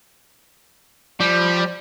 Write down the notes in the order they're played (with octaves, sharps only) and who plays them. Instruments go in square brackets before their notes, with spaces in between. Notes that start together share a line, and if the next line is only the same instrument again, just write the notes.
[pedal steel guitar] F3 [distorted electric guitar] G3